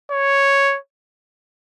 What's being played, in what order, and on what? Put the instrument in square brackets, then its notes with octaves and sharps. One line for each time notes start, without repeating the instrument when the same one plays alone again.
[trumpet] C#5